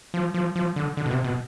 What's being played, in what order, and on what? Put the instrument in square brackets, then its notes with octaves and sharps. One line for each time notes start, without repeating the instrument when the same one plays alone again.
[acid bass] F3
F3
F3
D3
D3
B2
C3
B2